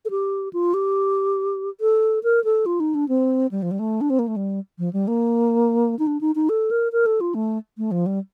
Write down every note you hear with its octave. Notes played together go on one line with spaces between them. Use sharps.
A4
G4
F4
G4
A4
A#4
A4
F4
D#4
D4
C4
G3
F3
G3
A3
D4
C4
A#3
A3
G3
F3
G3
A#3
D#4
D4
D#4
D#4
A4
A#4
A#4
A4
F4
A3
A3
F3
G3